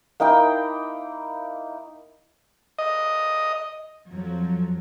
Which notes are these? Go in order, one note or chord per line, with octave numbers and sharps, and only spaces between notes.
A#3 D#4 E4 G5
D#5
F2 F3 F#3